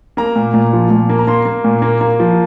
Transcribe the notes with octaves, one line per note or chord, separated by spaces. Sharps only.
A#3 A#5
A#2
A#2
F3
A#2
A#3
A#5
A#3 C6
A#3
A#2
A#3
A#3
F3